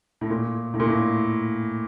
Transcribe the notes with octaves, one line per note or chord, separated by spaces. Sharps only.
A2
A#2
A2
A#2
A2